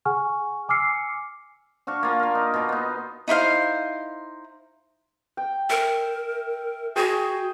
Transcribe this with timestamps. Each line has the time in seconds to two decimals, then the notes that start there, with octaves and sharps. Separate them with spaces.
0.05 G#4 F#5 G#5 C#6 F6
0.69 G#5 D6 E6 F6 C7 C#7
1.87 D4 F#4 F5 C#6
2.03 A#3 F4
2.20 F4 A#4
2.35 D#4
2.54 B2 F4
2.69 B3 D#4
3.28 D#4 E4 C5 F5
5.37 G5
5.70 A#4 E5
6.96 F#4 G#4 G5 G#5